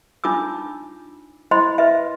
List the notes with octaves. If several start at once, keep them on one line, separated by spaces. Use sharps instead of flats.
D4 D#4 F4 D6 E6
E4 C5 D#5 B5 C6
B4 D#5 E5